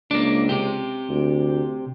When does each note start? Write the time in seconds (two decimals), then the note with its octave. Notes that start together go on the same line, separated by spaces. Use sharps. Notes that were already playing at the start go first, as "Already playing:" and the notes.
0.11 C#2 A#3 D4
0.49 C3 G4
1.09 D2